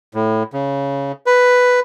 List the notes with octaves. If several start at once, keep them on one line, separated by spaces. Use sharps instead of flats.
A2
C#3
B4